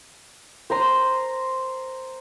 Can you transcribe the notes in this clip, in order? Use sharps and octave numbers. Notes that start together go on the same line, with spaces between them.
C5 A#5 C6